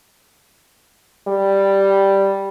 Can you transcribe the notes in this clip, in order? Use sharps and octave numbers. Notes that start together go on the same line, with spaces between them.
G3